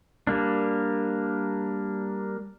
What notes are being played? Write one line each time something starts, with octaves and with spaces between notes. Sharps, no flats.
G3 A#3 D4